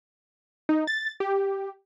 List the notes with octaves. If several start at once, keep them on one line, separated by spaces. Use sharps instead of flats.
D#4
A6
G4